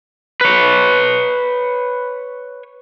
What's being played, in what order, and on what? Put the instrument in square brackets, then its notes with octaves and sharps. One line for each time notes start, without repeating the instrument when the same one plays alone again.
[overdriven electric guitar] B4 C#5